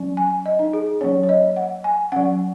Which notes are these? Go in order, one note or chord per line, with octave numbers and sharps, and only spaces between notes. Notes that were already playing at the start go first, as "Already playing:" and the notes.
Already playing: F#3 C#4
G#5
D#5
D#4
G#4
F#3 A#3 C#4 C#5
C#5
D#5
F#5
G#5
F#3 C#4 F#5